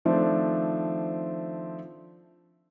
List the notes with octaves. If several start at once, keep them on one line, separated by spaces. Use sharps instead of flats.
D#3 F3 A3 C4 D4